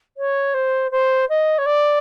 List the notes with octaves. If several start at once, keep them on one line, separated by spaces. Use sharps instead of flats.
C#5
C5
C5
D#5
C#5
D5